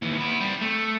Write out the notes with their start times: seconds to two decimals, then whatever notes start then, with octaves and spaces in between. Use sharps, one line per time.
0.02 D#2 E3
0.17 B3 E4
0.41 G3 C4
0.62 A3